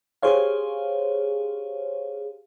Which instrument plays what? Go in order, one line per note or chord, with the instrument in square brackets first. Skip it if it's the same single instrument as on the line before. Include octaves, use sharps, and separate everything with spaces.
[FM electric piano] G4 G#4 C5 C#5 F5